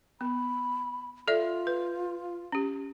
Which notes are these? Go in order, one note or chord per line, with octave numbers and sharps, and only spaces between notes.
B3 B5
F4 A4 D5 E5
B4
C#4 G4